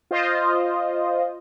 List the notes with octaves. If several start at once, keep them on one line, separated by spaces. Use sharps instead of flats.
F4 C5 D#5